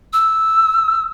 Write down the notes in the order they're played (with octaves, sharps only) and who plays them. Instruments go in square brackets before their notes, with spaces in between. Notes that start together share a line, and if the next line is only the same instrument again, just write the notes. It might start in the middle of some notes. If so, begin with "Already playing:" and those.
[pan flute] E6